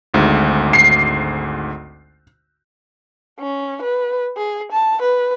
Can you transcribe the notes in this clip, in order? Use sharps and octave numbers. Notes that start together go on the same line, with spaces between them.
G#1 D2 G#2
C7
C#4
B4
G#4
A5
B4